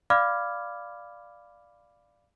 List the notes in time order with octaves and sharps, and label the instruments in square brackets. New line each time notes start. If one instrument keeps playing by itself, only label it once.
[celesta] D5 F5 B5 D6 F6 G#6